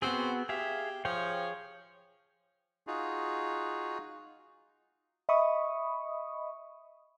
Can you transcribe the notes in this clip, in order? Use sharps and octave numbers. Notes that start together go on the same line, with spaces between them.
B3 C4 F#4 G#4
G4 G#4 E5 F5
F3 G#4 C#5 G5
D#4 F4 F#4 G#4
D#5 E5 B5 C#6 D#6